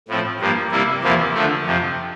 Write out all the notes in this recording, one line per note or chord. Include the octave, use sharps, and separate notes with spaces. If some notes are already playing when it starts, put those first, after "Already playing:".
A2 F3 C4
G2 F3 A#3
C3 G3 A#3 E4
E2 C3 F3 A#3 E4
D3 F3 A3
F2 C3 F3